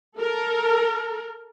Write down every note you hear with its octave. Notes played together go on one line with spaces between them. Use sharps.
A4 A#4